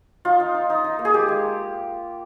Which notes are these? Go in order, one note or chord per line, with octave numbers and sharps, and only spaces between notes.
D#4 F4
D#4
D#4
D#4
D#4
A#3
G#4
G#3 G4
G#3